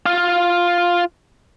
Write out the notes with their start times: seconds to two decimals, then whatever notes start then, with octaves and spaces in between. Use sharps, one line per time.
0.06 F4 F5